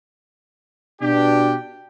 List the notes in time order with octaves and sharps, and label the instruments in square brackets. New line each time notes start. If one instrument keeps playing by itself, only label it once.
[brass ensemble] B2 D4 G4